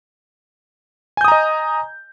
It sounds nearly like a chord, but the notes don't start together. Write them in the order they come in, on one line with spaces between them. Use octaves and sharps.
G#5 G6 D#6 A#5 D#5